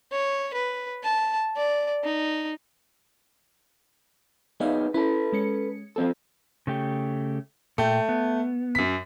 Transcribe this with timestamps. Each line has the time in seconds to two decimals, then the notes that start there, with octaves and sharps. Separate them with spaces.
0.11 C#5
0.54 B4
1.03 A5
1.56 D5
2.04 D#4
4.60 B3 D#4 G#4 D5 E5 F5
4.94 C#4 E4 A4 B4
5.33 G#3 C#4 C#7
5.96 F3 C4 A4
6.67 C#3 A3 G4
7.78 A#2 A3 G5
8.09 B3
8.75 F#2 B6